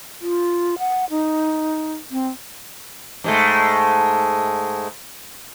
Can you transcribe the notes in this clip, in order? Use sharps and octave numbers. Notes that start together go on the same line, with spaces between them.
F4
F#5
D#4
C4
G#2 G#3 A3